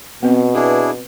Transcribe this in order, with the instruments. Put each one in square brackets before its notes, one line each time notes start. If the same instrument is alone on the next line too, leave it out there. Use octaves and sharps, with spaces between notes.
[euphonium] B2 [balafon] B3 C4
[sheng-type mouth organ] D4 E4 G#4 [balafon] B4